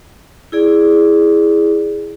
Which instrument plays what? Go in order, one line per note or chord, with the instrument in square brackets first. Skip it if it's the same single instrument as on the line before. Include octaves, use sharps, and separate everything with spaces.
[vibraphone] E4 G#4 D5